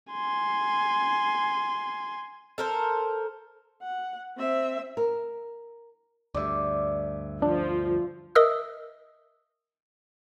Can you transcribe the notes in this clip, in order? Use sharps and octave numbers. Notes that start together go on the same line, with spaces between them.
G#5 C6
A4 A#4 C5
F#5
C4 E5
A#4
D2 G2 D5 E5
F3 D4
A#4 D#5 E5 D#6 E6